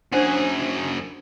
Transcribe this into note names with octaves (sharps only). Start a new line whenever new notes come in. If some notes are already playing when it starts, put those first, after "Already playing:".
F#2 D4 G#4 C5 F#5